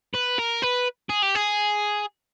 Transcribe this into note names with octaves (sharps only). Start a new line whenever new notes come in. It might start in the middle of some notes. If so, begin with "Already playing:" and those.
B4
A#4
B4
G#4
G4
G#4